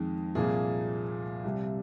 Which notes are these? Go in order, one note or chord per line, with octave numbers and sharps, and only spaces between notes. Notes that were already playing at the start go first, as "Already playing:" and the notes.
Already playing: F2 D#3 G#3
C2 A#2 F3 A#3 G#4
C2 C3 G3